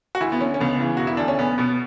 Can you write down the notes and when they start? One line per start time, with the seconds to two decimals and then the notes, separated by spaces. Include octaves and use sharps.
0.15 F#4
0.21 D2 E4
0.32 B3
0.41 D3 C#4
0.54 C#4
0.60 C#2 B3
0.79 C#3 E3
0.97 E1 F#4
1.07 E4
1.17 D2 D3 D4
1.28 C#4
1.38 B1 B3
1.58 B2 B3